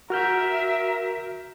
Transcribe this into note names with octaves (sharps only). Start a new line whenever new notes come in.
F#4 A#4 E5 F6 G6